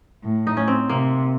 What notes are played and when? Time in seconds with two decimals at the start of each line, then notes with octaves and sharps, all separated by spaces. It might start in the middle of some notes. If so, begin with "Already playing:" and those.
0.24 A2
0.47 D#4
0.57 C#4
0.68 C4
0.89 C3 A#3